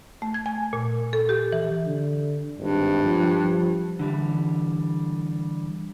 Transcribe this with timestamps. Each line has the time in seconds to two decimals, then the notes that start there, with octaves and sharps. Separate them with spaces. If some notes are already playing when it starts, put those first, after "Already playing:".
0.22 A3
0.34 G#6
0.46 G#5
0.73 A#2
1.13 A4
1.29 G4
1.53 E3
1.86 D3
2.58 G#1 G2
3.05 F3
3.44 F3
3.99 D3 E3 G3